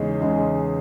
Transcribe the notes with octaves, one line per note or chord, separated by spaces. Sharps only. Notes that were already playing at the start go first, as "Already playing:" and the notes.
Already playing: E2 C#3 G#3 D#4
C#3 G#3 D#4